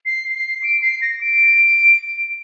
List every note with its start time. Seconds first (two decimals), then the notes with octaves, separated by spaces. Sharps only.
0.06 C7
0.35 C7
0.63 D7
0.82 C7
1.02 A#6
1.21 D7